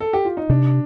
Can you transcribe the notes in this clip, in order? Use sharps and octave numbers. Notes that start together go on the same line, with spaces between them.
A4
G4
F4
D#4
C3 D4